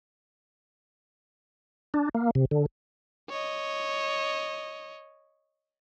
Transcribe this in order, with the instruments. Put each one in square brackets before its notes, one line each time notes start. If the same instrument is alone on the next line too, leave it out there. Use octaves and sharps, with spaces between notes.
[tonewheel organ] D4
A#3
C3
D3
[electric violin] C#5 D#5